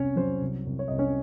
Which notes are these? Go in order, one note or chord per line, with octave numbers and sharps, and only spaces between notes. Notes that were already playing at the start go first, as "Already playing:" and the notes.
Already playing: C2 C3 C#4 C#5
F#3 C5
C2
C2
C#5
C2 D#5
C#4 C#5